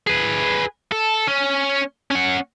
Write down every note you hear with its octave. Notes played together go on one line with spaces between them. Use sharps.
G#4 B4
A4
C#4
C#4 F#5